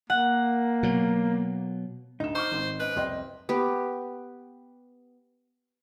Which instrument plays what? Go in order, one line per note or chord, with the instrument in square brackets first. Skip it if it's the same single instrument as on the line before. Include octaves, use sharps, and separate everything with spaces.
[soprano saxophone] A#3 [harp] F#5
[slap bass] B2 F#3
[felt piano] D2 E7 [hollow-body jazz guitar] D#4
[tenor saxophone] C5 [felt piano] C#6 D6 F6
[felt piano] G#1 C4 C6
[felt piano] C#4 D#5 D7 [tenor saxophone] B4
[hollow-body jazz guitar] C2 F2 [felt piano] D#5 G5 C6
[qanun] B3 G4